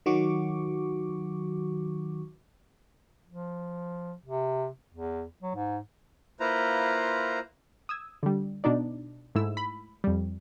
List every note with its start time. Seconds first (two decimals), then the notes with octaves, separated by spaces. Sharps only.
0.06 D#3 F#3 F#4 C#6 D6
3.28 F3
4.25 C3
4.92 E2
5.43 F#3
5.55 G#2
6.40 A#3 E4 F4 B4 C5 A#5
7.89 D#6 E6 G#6
8.23 D3 G3
8.64 B2 D4 D#4 D5
9.35 G#2 A3 E4 E6
9.57 B5
10.04 F2 G3